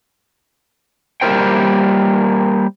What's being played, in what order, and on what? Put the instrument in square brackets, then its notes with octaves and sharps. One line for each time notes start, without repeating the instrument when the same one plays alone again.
[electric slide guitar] G3 A#3 F#4 A#4 C5 G5